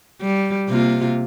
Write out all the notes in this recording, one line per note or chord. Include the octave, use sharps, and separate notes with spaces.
G3
C3 A#3 F4